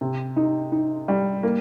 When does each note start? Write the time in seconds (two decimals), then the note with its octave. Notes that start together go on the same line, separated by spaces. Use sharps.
0.01 C3
0.36 D#4
0.72 D#4
1.08 G3
1.43 A#3